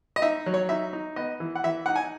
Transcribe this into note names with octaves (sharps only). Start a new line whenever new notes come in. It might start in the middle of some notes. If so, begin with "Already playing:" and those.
D#5
D#4 E5
F#3
C#5
D#4 E5
D#4
B3 D#5
E3
F#5
E3 E5
D#4 F#5
G#5